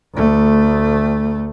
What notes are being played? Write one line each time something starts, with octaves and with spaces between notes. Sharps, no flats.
D2 A3